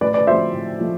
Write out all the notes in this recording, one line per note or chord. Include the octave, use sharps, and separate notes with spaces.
A2 B4 D5
B4 D5
F3 A3 C4 C5 E5
A2
F3 A3